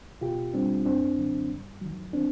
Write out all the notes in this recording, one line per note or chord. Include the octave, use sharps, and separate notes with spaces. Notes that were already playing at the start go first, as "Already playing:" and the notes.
B2 F4 G4
G3 C4 D4
F#2 C4 D4
D3 F#3
G2
D#3 F#3
C4 D4